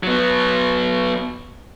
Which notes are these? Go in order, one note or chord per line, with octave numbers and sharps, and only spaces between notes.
F#3 B3